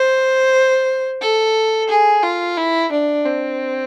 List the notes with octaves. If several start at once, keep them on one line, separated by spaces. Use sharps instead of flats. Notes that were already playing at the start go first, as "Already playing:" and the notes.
Already playing: C5
A4
G#4
F4
E4
D4
C4